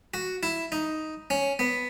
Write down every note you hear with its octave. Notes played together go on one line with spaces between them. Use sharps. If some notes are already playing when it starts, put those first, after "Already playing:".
F#4
E4
D#4
C#4
B3